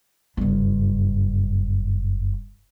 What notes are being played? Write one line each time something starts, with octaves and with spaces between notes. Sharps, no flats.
F#1 G2